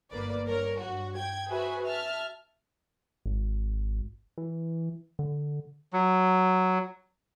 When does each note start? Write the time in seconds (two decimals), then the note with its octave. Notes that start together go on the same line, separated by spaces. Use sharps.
0.12 G1 A#3 B4 D5
0.46 G2 A#4 C#5
0.80 G2 F#4
1.16 G5 G#6
1.49 F#4 G#4 B4 C5 E5 G#5
1.85 E5 A5 F6
3.26 G#1
4.38 E3
5.19 D3
5.93 F#3